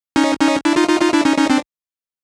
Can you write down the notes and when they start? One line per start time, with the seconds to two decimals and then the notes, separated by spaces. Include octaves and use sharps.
0.16 C#4 D#4
0.40 C#4 D#4
0.65 D4 E4
0.76 D#4 F4
0.89 D#4 F4
1.01 D#4 F4
1.13 D4 E4
1.25 C#4 D#4
1.38 C#4 D#4
1.50 C4 D4